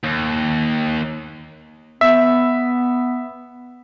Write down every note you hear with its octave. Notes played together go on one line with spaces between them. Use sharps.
D#2
B3 E5